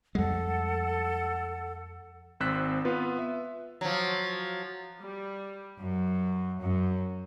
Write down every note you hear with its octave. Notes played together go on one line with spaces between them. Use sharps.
F2 G3 G#3 A4 F#5
G#1 C4 C5 E6 F#6 B6
B3 F4 B4
E5
F3 F#3
G3
F#2
F#2